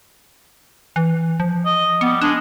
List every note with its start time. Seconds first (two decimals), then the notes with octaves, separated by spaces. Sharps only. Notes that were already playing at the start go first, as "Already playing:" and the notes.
0.96 E3
1.40 F3
1.66 D#5
2.01 G3 B3
2.21 G#3 D4